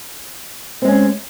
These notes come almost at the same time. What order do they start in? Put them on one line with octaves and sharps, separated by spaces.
C4 G#3 C#4